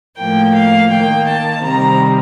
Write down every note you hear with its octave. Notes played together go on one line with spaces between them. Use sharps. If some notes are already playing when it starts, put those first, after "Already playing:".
A2 F3 A#3 G5
F5
D#3 A#3 G5
A5
C3 D#3 G3 C4 A#5